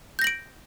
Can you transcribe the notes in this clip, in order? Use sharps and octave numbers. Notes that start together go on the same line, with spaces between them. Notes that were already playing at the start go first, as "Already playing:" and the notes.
G6 A#6 D7 F#7